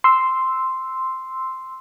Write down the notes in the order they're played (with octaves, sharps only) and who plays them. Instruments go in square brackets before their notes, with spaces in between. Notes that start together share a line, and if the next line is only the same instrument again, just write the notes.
[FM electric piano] C6 E6